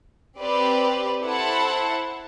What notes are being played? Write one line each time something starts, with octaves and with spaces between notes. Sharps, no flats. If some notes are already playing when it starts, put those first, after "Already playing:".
C4 G4 B4 D5
E4 A4 C5 F#5 A5